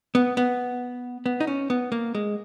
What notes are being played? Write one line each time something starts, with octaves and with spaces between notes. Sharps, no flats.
B3
B3
B3
D#4
C#4
B3
A#3
G#3